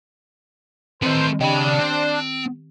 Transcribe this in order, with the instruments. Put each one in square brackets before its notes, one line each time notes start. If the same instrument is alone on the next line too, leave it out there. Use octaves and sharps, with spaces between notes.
[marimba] D#3 C4 [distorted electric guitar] A3 B4 [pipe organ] C5
[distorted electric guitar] C#3 B5 [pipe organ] D4 [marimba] G4 D#5 G5
[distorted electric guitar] C4